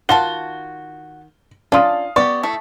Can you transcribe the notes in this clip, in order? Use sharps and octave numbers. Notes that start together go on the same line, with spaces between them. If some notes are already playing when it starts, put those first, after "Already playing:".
D#3 F4 F#4 F#5 A5 G7
C#4 D4 F4 D5 F5 D#6
B3 G4 D5 C#6
A3 E4